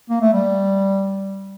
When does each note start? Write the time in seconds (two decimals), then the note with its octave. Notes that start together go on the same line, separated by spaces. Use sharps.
0.10 A#3
0.21 A3
0.33 G3